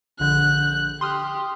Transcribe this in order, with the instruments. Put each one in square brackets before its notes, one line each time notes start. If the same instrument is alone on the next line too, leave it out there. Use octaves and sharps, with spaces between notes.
[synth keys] A#1 D3 G6 [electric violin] F#6
[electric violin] G4 [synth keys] C6 D#6 F6